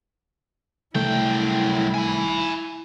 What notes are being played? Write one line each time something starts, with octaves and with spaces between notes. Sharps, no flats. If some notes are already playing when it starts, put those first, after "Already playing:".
C2 F#2 A3 E4 G5
G#5 B5